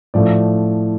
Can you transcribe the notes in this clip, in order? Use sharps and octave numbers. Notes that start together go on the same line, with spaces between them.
A2 F3 A3 D5